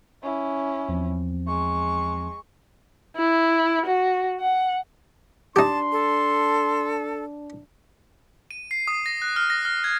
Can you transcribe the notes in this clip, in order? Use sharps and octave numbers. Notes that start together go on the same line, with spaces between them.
C#4 E4
E2 F3 C4
G#3 C#6
E4
F#4
F#5
D4 D#4 G4 A5 C6
A4
D#7
C7
D#6
A#6
F#6
F6
A#6
F6
G#6